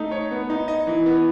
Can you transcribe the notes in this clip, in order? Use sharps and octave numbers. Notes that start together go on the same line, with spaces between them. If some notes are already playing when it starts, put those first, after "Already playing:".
Already playing: A3 D#4
C#5
B3
D#4
D#5
E3
B3